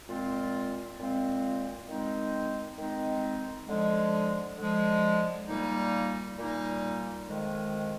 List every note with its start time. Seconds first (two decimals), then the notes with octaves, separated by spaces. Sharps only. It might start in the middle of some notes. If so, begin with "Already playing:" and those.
0.08 A#2 G#3 C4 F4
0.98 A#2 G#3 C4 F4
1.88 D#3 G#3 C4 D#4
2.78 D#3 G#3 C4 D#4
3.68 D3 F3 G#3
4.58 D3 F3 G#3
5.48 A#2 G3 A#3 D#4
6.38 A#2 G3 A#3 D#4
7.28 F2 D#3 G#3